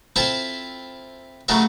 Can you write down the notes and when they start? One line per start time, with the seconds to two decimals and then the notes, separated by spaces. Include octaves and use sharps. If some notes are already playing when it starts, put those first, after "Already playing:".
0.16 C4 E4 F4 A4 E5
1.48 C#3 F#3 A3 F4 A4 A#4